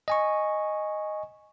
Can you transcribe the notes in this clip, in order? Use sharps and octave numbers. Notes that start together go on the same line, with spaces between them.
D#5 G#5 C#6